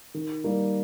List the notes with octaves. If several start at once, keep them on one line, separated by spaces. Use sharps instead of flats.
D#3
G3 A#3 D#4